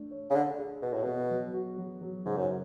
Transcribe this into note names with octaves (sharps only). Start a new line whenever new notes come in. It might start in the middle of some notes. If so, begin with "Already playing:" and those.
Already playing: A3 D4
C#5
C#3
D3 D4
G#4
B2 F#4
A2
B2 B3
F#3
F#4
F#3
F#3
G#2 C#3
F#2
F#4